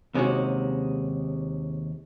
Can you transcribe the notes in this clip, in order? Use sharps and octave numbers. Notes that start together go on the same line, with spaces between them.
D#2 C3 G#3 C#4 D#4 F#4